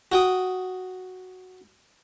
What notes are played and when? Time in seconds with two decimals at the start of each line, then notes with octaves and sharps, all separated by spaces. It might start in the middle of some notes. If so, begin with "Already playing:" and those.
0.12 F#4 G5 D#6